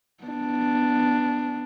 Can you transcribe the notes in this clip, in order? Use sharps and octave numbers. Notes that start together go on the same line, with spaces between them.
B3 D4